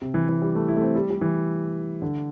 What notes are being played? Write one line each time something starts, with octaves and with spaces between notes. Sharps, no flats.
C3
E3
E3
G3
A3
E4
A3
C4
G3
G3
E3
D3